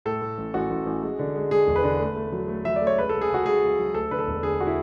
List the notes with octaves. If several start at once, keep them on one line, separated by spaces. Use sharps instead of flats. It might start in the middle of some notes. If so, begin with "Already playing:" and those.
A2 A4
A2
A1
A1 F#4
A1
A1
G#3
D3
G#3
G#3 G#4
E1
B4
D3
A3
A3
F#3
A3
F#3 E5
D5
A3
C#5
C#2 B4
C#2 A4
G#4
C#3 F#4
C#2 G#4
C#2
F#3
D2 A4
D3 B4
A4
E1
D3 G#4
F#4
E4